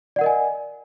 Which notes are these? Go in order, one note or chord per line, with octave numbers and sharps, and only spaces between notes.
A#4 D5 D#5 F#5 G#5